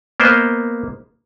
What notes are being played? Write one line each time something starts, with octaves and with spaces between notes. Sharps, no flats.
A#3 B3 A#4 C5 D#5